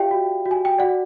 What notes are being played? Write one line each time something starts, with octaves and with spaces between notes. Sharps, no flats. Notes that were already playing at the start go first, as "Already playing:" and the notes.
Already playing: F4 G4 D5 E5 F5 G5
F#4
F#4
G#5
G5
F#4 D5 F#5